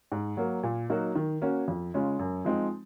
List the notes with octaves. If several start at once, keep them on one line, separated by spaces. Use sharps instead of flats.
G#2
F#3 A#3
A#2
F#3 A#3 D#4 F#4
D#3
A#3 C#4 F#4
F2
C#3 G#3 C#4 F4
F#2
F3 G#3 C4 D#4